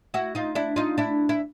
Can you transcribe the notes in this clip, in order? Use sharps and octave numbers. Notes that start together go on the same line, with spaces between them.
E4 F#4
D#4 F4
D4 E4
D#4 F4
D4 E4
E4